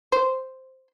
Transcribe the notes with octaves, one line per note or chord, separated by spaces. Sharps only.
C5